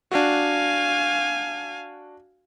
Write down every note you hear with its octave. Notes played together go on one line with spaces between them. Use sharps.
D4 F#4 F5 G#5